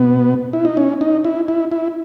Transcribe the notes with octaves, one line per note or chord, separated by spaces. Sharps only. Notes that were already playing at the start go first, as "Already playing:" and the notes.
Already playing: B2 B3
E4
D#4
C#4
D#4
E4
E4
E4